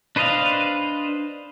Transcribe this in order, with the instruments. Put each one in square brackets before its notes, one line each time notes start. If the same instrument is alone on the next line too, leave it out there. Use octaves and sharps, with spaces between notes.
[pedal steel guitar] D4 B4 C5 D#5 F5